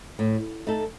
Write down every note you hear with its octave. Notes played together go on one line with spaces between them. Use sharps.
A2
A3 D#4 A4